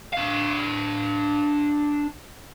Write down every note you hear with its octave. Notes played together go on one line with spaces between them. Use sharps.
D4 F5